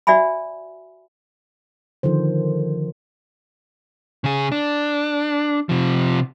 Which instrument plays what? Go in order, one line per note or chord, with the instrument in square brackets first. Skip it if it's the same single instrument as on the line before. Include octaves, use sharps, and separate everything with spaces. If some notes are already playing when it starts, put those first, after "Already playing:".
[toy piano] F#4 D5 E5 G#5 B5
[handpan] D3 D#3 F3 C5
[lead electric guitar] C#3 G#4
D4
C3 F3